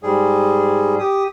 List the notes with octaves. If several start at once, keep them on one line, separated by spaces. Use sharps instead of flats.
G#2 G3 G#4
G4 D#6